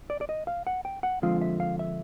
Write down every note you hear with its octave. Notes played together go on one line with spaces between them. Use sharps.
D5
D5
D#5
F5
F#5
G5
F#5
D3 F3 G#3 C4 F4 F5
E5
F5
E5